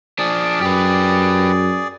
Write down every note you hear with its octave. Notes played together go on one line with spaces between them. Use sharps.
F3 D4 G#4 D5
F#2 G4 B4